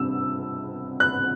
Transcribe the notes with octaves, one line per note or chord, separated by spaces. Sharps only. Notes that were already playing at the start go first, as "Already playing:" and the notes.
Already playing: C3 G3 D4 E6
F#6